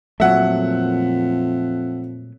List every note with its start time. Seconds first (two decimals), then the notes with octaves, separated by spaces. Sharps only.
0.20 F2 A#2 F#3 A3 E5 F#5